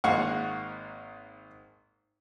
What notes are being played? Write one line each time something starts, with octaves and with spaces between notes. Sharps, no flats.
G#1 G#2 A#3 F5 F#5 C#6